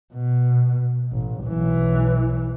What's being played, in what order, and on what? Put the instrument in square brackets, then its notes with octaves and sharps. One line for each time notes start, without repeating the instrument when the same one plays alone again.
[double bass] B2
A1
B1 E3